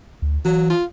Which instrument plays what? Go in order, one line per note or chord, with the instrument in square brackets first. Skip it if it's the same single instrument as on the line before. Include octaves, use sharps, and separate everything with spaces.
[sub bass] D2
[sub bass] E3 [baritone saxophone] F#3
[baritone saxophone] F4